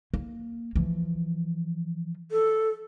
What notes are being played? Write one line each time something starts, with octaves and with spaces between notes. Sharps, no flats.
A#3
E3 F3
A4